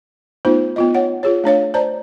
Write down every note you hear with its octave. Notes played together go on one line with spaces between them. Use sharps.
A3 B3 D#4 F4 C5
B3 F4 D#5
C#5 F#5
F4 G#4 C#5
A3 D4 C#5 F5
C5 D5 A5 A#5